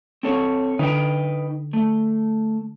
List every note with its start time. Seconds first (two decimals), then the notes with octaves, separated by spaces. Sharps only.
0.23 C4 A4 C#5
0.79 D3 D#4 B4 G5
1.73 A3